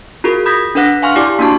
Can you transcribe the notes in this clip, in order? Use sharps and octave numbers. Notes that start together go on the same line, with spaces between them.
F4 F#4 G#4 A#4
B5 D#6 G6 G#6 A#6 B6
D4 A4 B4 F#5 F#6 A#6
F5 G#5 C6 C#6 F6
E4 G4 D5 D6 F6
A#3 D4 D#4 F#4 A5 C#6